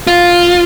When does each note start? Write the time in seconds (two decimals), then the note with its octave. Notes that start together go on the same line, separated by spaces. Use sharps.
0.07 F4